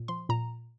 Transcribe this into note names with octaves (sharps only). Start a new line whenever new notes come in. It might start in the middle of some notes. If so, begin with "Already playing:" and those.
Already playing: A#2
F3 C6
A#2 A#5